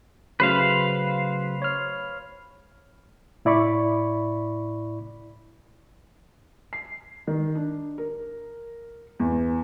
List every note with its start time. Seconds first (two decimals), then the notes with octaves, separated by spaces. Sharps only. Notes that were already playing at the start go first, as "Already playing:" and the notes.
0.40 C#3 F#3 A3 B4 C5 F5
1.62 C#5 F6
3.45 A2 E4 D5 B5 C#6
6.73 C7
7.27 D#3
7.55 D4
7.98 A#4
9.20 E2